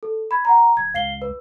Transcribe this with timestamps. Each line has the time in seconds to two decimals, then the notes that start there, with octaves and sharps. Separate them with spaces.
0.03 A4
0.31 B5 G#6
0.45 F#5 A#5
0.77 D1 G#6
0.94 C#2 F5 C7 G7
1.22 B4